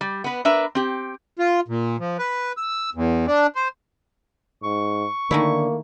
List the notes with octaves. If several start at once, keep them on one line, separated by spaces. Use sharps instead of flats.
G3
B3 B4
D4 A#4 B4 E5
C4 G4
F4
A#2
F3
B4
E6
E2
D4
C5
G#2 C#6
D3 D#3 A3 A#3 E4